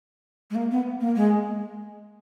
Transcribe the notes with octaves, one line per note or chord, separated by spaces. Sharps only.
G#3
A#3
B3
A#3
G#3